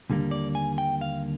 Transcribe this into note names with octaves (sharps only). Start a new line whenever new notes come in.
D#2 D3 G3 A#3
D5
G#5
G5
F5